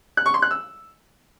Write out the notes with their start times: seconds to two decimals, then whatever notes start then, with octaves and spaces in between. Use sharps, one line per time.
0.17 F#6
0.26 C#6
0.34 C6
0.42 F#6
0.51 E6